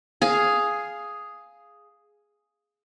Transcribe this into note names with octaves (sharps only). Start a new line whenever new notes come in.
G#4 F5